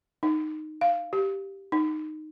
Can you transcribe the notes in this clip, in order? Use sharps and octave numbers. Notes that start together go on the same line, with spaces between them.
D#4
F5
G4
D#4